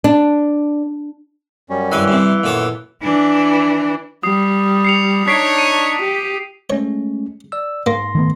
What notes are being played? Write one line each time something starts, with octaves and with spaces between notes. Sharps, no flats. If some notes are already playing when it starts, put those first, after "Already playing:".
D4
F#2 G3 C#4
G2 E3 B4 G#5
G2 C3
F#2 A#2 B3 A4 C#5
E3 D4
G3 D#6 C7
C7 C#7 F7
D4 D#4 C#5 B6 C7 D7
D#7
G4
G#3 A3 C#4 C#5
D5 E6
G#2 A#3 C6 A#6
D#3 A3 B3